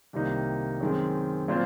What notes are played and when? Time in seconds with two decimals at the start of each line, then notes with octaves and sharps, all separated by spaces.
0.13 C2 C3 D#3 A#3 D#4
0.80 F#2 D#3 G#3 C4
1.48 A#2 F#3 C4 F4 C5